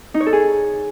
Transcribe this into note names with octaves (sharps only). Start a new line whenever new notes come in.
D#4
C#5
A4
G#4